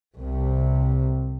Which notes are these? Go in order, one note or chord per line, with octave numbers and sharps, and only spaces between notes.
C2 C3